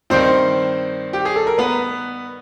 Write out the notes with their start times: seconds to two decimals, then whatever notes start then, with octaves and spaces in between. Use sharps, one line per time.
0.10 G2 D#3 C4 C5
1.13 G4
1.25 G#4
1.36 A4
1.47 A#4
1.58 B3 B4